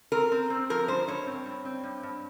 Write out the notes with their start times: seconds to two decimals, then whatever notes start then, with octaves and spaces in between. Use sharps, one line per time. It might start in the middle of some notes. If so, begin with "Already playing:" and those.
0.12 C4 A#4
0.32 C4
0.50 C4
0.70 F3 A#4
0.88 G2 C5
1.08 G2 C#5
1.26 C4
1.46 G2
1.65 C4
1.84 G2
2.03 G2